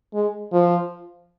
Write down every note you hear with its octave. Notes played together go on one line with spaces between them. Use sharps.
G#3
F3